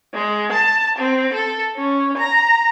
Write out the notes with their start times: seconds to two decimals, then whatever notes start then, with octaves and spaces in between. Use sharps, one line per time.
0.14 G#3
0.53 A5
0.99 C4
1.33 A4
1.76 C#4
2.17 A#5